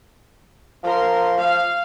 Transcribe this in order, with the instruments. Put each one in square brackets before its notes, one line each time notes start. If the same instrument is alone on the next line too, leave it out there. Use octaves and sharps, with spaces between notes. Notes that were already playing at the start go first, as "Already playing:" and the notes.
[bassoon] F3 [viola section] A#4 C6
[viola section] F5